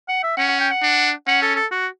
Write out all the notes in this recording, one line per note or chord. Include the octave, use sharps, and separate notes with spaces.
F#5
E5
C#4 F#5
F#5
G5
F#5
D4
C#4 F#5
A4
A4
F#4